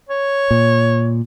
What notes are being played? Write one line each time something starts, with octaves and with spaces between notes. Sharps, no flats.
C#5
A#2